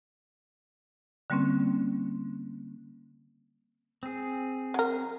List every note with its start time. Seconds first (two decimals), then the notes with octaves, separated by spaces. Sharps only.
1.30 D3 G3 A#3 C4 C#4
4.03 C4 G#4
4.74 F#3 A#4